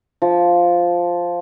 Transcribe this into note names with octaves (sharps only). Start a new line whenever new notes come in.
F3